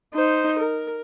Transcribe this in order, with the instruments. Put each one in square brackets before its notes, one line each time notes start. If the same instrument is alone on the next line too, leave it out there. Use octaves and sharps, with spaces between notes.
[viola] D#4 C5
A#4